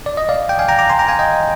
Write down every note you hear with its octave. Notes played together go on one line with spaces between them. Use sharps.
D5
D#5
D5 F5
G5
F5 G#5
G5 A#5
A#5 D6
G#5 C6
G5 A#5
F5 G#5
D#5 G5